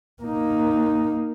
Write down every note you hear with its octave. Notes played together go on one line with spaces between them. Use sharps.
A#3 D#4